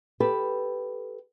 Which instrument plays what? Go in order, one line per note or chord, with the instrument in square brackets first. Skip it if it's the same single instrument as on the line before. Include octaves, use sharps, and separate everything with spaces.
[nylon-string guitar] G4 A4 B4